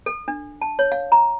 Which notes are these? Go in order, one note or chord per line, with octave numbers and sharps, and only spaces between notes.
A4
D4
A5
C#5
F5
A#5